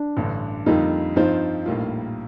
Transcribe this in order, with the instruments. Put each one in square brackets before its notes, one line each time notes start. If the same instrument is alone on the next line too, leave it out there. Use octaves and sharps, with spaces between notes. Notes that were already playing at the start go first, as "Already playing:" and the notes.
Already playing: [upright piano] D4
[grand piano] A1 G2 D3
[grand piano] F2 D3 G3 A#3 F4 [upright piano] D#4
[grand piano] G2 F3 C4 F4 C5 [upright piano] D#4
[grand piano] A#1 A2 G3 A#3 F4